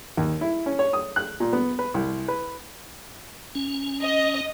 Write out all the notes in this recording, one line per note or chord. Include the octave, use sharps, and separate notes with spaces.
D#2
E4
C#4
C#5
D#6
F#6
A#2
B3
B4
C2
B4
C#4
D#5